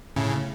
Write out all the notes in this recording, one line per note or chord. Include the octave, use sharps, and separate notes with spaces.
A2 C#3